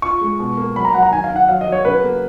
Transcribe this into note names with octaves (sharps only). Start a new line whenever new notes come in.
F4 C#6
G#3
B2
A#3
F#3 B5
A#5
F#3 F#5
A#5
D#3 G#5
F5
D#3
F#5
F#3 F5
D#5
F#3
C#5
C#3 B4
A#3